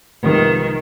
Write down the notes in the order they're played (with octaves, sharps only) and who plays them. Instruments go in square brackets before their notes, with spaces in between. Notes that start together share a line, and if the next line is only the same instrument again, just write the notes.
[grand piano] C2 C3 F3 G#3 B3 [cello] D#3